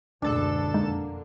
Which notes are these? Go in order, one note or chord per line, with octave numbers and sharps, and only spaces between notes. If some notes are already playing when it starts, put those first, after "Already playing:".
F#1 D2 B2 G#3 D4 A4 E7
F2 D3 G#3 A#3 D#4